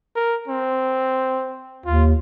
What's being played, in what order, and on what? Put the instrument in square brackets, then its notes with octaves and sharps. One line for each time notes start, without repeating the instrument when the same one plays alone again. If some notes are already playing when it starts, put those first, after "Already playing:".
[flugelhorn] A#4
C4
[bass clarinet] D#2 [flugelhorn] F4